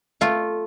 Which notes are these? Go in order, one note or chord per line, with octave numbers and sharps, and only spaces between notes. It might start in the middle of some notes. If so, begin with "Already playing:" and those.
A3 F4